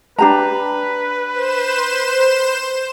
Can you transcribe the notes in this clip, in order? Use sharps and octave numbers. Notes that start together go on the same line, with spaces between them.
D4 G4 B4 A#5
C5 E7